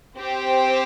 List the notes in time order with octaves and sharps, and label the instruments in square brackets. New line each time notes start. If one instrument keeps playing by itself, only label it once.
[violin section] C4 G4 C5 G5